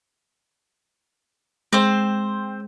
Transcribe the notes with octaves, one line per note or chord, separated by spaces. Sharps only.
G#3 C4 C5